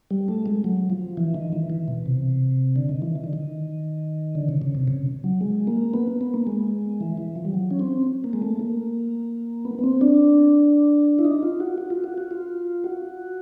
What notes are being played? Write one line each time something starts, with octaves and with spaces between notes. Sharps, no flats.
G3
A3
G#3
F#3
F3
E3
D#3
E3
E3
B2
C3
D3
D#3
E3
D#3
D3
D#3
D3
C#3
C#3
C3
C#3
F#3
G#3
A#3
B3
B3
A#3
G#3
E3
E3
F3
G3
F#3
C#4
C4
A#3
G#3
A3
A#3
B3
B3
C4
D4
E4
D#4
F4
F#4
F#4
F4
F#4
F#4
F4
F#4